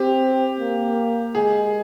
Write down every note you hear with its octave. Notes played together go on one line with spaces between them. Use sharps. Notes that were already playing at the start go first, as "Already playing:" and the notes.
Already playing: C4 G4
A#3
G#3 G#4